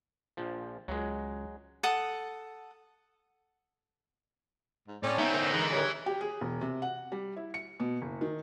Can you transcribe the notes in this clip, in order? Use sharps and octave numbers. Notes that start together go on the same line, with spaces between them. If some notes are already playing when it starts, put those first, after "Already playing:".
A#1 F3
C#2 F#3 G#3
A4 F#5 D#6
G#2
A2 C4 C#4 C5 D5
B3 C4 D4 D#4 E5
D3 A#4
E3 G#3
G3 G#4 A4 C#5
G4
G#4
E1
C3
F#5
G3
E4
C#7
B2
F#1
D#3